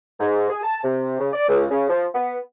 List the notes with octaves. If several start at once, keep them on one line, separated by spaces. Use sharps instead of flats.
G#2
G#4
A5
C3
C#3
D5
C#2
C#3
F3
B3